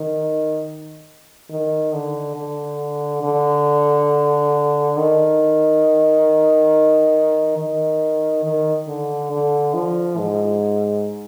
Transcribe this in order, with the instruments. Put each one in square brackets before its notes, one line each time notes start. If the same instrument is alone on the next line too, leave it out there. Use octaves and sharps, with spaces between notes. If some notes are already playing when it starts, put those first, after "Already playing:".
Already playing: [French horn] D#3
D#3
D3
D3
D3
D#3
D#3
D#3
D3
D3
F3
G#2